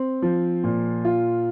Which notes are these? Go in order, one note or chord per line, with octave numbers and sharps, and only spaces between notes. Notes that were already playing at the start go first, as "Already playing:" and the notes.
Already playing: C4
F3
A#2
F4